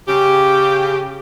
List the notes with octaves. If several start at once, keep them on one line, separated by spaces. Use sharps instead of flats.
C#3 G4